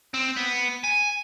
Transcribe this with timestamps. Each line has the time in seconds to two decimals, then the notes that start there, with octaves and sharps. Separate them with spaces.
0.14 C4
0.37 B3
0.84 G#5